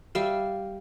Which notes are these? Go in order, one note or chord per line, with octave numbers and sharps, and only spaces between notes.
G3 E5 F5